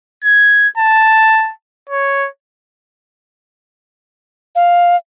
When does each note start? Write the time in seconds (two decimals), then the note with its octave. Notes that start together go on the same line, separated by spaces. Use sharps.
0.24 G#6
0.78 A5
1.90 C#5
4.55 F5